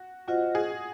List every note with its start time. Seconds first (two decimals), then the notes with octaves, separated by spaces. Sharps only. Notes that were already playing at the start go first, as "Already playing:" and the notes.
Already playing: F#4
0.28 F4 F#4 C5 D#5 F#5
0.55 G#4